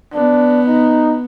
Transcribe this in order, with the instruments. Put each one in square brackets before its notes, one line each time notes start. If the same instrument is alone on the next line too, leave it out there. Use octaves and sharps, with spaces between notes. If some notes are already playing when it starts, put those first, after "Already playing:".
[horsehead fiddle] B3 [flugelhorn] D4
[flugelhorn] D#4